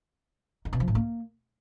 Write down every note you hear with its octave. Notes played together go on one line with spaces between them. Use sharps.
D#3
B2
F3
A2
A#3